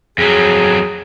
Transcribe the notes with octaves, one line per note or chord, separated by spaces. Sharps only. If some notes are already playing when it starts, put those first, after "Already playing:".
F2 F#3 G#4